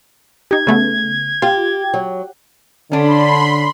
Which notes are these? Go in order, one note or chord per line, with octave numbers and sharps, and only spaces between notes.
D#4 G4 G#6
C#3 A3 B3
F4 G4
F#3
D3 C#4 D4 B5 C6